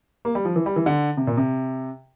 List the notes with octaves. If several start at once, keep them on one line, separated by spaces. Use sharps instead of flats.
A#3
G3
F3
E3
G3
E3
D3
C3
A#2
C3